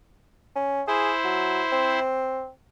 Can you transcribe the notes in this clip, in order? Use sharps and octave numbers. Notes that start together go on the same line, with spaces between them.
C#4
E4 G#4 C5
F#3
C4